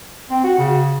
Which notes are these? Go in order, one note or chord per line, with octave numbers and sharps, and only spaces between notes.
C4
F#4
C#3